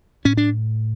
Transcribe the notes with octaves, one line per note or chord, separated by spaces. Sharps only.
A2 C#4
D4